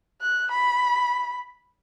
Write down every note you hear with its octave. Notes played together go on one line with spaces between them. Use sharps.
F#6
B5